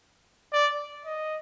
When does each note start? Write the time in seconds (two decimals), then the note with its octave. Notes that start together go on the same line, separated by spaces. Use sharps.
0.53 D5
1.05 D#5